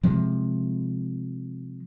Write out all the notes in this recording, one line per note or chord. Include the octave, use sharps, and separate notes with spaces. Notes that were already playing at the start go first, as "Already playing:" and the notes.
C3 F3 G#3